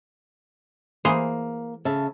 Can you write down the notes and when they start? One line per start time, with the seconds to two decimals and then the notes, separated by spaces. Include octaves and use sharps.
1.05 E3 A#3 G#4 C5
1.85 C#3 E5 A5